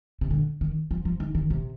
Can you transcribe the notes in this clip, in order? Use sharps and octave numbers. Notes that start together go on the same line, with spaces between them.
C3
D3
D#3
F3
F3
D#3
D#3
C3